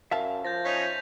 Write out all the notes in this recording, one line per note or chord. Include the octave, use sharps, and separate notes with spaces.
F#2 E5 F5 A5
F3 G6 A6 A#6
C#4 D#4 C#5 B6 F7